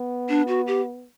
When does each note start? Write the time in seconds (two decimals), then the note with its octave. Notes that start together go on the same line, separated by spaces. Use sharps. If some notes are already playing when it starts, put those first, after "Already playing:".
Already playing: B3
0.29 D4
0.48 F#4
0.67 G4